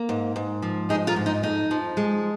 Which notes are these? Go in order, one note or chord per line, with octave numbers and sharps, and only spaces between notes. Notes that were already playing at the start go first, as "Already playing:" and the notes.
Already playing: A#3
G#2
G#2
F3
G#3 D#4 G#4
F4 A#4
G#2
D#4
F2 D#4
F3
G#3